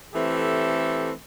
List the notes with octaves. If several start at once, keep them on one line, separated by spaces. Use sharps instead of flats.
E3 A3 C4 G4 A4